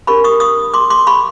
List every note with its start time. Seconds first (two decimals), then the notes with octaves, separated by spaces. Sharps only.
0.07 D4 G4 A#4 B5 C#6
0.24 C#6 D#6
0.40 C#6 D#6
0.74 C6 D6
0.90 C6 D6
1.07 B5 C#6